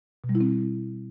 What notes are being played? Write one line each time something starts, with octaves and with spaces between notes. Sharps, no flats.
B2
G3
E4
C4